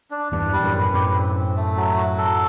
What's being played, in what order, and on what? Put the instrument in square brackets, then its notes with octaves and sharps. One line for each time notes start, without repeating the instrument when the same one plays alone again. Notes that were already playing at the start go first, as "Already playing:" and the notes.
[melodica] D4
[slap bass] E2 G2 [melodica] D4
[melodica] G3
[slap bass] F#2 A2
[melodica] B4
[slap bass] F#2 A2 [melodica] G4
[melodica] C4
C4
A3
F#3
F#4
A4